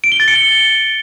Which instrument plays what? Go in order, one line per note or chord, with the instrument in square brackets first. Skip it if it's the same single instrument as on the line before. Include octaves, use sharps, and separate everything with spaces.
[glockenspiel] D7
G7
A6
C#7
G7